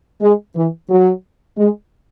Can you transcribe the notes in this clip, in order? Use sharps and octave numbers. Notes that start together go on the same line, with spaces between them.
G#3
E3
F#3
G#3